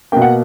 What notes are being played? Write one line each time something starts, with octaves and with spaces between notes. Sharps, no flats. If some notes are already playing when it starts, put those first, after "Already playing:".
B2 A#3 G5
F#5